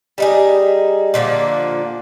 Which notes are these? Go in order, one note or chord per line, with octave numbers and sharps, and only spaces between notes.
G3 D#4 G#4
A#2 D3 F3 A#3